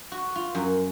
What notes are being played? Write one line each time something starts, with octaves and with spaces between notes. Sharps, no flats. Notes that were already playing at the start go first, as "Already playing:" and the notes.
F#4
F4
F#2